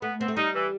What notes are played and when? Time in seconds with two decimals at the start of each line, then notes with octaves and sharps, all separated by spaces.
0.02 A3 B3
0.19 B3 C4
0.28 A3
0.37 G3 D#4
0.54 E3